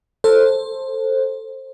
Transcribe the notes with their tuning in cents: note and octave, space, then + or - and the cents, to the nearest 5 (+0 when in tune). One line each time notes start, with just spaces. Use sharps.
A4 +15 C5 +15